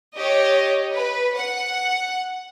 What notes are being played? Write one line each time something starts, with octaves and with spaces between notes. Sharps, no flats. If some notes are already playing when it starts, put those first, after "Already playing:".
G4 C#5 D#5
B4
F#5